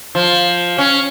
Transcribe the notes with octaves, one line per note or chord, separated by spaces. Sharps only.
F3
C#4